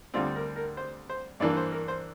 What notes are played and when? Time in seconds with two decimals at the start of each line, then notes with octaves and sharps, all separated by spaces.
0.14 D2 D3 G3 C4 F4
0.36 A#4
0.56 A#4
0.77 C5
1.10 C5
1.40 G2 E3 A#3 D4 D5
1.57 C5
1.72 A#4
1.88 C5